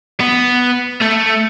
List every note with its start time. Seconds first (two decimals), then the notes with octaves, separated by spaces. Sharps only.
0.20 B3
1.02 A3